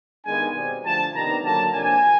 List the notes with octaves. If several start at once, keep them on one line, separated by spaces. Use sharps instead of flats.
G2 D#3 G#3 B3 D4 G#5
B2 G3 C4 G#5
D3 F3 A3 A5
C3 D#3 G3 B3 D4 A#5
D3 F#3 A#3 A5
C3 F3 A#3 D4 G#5